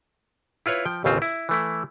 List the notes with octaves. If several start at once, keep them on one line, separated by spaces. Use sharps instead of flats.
E4 F4 B4 C#5
F3 G5
A1 D#2 C#3 C4 F4 C5
E4
E3 A3 E4